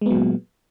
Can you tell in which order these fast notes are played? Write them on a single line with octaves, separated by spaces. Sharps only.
G#3 B3 F#3 A#2